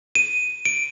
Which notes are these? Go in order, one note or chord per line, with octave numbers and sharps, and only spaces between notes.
D#7
D7